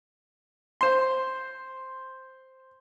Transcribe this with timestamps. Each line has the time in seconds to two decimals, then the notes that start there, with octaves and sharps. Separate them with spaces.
0.81 C5 C6